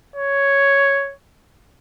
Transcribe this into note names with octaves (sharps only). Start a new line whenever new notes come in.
C#5